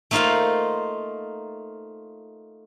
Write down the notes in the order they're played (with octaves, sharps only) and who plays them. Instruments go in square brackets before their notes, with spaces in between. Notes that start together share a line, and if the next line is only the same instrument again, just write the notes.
[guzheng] A3 A#3 D#4 F4 C5 F5